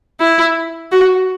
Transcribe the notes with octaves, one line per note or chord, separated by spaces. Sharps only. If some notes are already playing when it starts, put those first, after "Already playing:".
E4
F#4